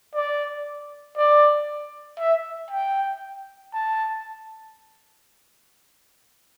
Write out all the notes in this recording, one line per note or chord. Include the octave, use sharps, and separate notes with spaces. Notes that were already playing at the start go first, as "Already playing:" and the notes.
D5
D5
E5
G5
A5